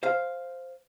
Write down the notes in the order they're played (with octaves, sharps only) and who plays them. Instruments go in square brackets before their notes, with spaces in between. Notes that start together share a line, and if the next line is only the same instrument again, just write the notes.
[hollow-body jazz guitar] C5 F5